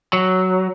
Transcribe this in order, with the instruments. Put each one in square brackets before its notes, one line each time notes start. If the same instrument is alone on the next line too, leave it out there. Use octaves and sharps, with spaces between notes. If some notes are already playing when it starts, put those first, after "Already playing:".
[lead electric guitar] F#3